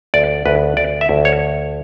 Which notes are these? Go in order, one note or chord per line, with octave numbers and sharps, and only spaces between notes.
D2 D5
D2 B4
D2 D5
E5
D2
C#5